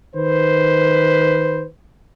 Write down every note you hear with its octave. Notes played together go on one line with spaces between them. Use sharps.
D#3 B4 C5